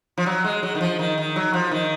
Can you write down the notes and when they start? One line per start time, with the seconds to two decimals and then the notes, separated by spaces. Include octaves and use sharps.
0.18 F3
0.26 F#3
0.44 G#3
0.63 F#3
0.75 D#3
0.81 F3
0.99 D#3
1.18 D#3
1.36 F#3
1.53 F3
1.71 D#3